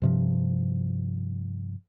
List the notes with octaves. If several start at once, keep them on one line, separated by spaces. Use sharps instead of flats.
G2 C3 F3